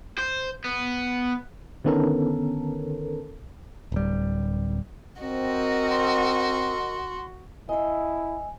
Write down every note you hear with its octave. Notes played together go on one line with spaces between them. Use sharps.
C5
B3
D3 D#3 B3 C#4 A4 A#4
D1 G3
C4 F#4 A#4 D#5
C6
E4 D#5 E5 G#5